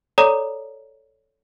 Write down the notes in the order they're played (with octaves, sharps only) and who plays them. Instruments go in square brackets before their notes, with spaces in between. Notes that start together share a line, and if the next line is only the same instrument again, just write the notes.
[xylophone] A4 C#5 D5 A#5 D#6